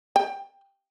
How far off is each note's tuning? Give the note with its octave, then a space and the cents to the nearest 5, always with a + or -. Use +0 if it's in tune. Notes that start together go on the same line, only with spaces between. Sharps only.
G5 +10